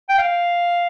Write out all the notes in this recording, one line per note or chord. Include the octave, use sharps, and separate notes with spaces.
G5
F5